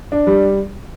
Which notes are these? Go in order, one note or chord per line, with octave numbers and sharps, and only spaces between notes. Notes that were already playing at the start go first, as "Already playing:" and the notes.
D4
G3